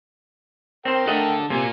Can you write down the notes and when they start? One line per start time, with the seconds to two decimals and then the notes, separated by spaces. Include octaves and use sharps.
0.85 C4 A#4 C5 G5
1.07 A3 D4 A4 D#5 F#5
1.50 C3 A#3 F4 G#5